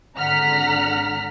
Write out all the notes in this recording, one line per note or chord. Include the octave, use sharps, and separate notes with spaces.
G#1 D3 F#5 A#5 F6 B6